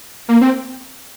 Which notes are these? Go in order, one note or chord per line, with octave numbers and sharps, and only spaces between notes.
A#3
C4